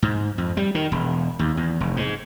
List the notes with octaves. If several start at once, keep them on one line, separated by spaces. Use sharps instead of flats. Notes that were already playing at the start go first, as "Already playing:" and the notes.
G#2
F2
G3
D#3
E1
D#2
E2
F1
G#2